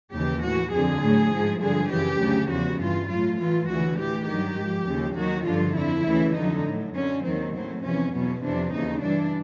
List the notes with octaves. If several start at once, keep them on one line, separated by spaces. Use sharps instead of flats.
D#2 C#3 E3 G4
A2 E3 F#4
F2 D3 F3 G#4
A2 F#3
G#2 F3
G2 D3 F3 G#4
F#2 C#3 E3 G4
D2 C#3 F#3
E2 C#3 F3 F#4
G2 E3 F4
A2 F#3 F4
A2 E3 F4
D2 C#3 E3 F#4
A2 E3 G4
G2 D#3 F#3 G4
G#2 F3
D#2 C#3 F3
D#2 D#3 F#3 F#4
G2 D3 F3 F4
F2 D3 F3 E4
D2 C#3 E3
F2 D3 F#3 D#4
A2 F#3
F#2 D3 F#3 C#4
D#2 D#3 F#3 C4
A2 F#3 C4
E2 C3 F3 C#4
E2 B2 F#3 C#4
F2 C3 E3 D4
D#2 C#3 E3 D#4
G2 E3 D4